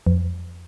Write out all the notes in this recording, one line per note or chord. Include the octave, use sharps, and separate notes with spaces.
F2